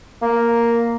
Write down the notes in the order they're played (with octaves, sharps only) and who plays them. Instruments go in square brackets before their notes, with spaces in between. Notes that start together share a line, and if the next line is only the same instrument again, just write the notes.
[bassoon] A#3